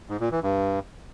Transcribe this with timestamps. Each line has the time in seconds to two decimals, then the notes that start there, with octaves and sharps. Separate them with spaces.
0.09 G#2
0.20 A#2
0.32 E3
0.43 G2